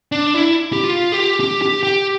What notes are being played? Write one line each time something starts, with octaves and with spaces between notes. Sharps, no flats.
D4
E4
G4
F4
G4
G4
G4
G4